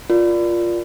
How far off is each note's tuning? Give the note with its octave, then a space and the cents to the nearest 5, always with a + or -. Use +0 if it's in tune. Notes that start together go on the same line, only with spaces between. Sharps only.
F4 +0 A#4 +15 D5 +0